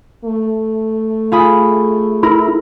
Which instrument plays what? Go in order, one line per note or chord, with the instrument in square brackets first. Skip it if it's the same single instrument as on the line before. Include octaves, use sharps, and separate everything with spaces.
[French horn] A3
[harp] F4 G#4 B5
[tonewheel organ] E4 [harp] A#4